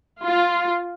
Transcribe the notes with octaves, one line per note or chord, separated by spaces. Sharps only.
F4